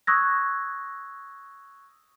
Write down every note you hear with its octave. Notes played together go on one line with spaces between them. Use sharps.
C#6 D#6 E6 F#6 G#6 A#6